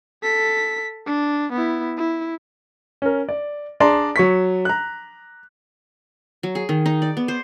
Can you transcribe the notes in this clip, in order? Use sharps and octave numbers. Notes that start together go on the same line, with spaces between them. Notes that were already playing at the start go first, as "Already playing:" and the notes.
A4 B6
D4
B3 E4
E4
C#4 A#4
D5
D4 G#4 D5 A5 A#5 C6
F#3 C#6 B6
A#5 F#6
F#3
G#4
D#3
D#4
D5
B3
C5